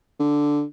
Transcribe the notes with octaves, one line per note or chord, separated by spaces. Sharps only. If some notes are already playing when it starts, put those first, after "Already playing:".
D3